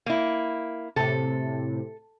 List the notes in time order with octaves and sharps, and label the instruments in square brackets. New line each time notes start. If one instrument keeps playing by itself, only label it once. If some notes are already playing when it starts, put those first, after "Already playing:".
[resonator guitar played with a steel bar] A#3 E4
[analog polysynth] A2 C3 [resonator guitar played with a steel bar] A4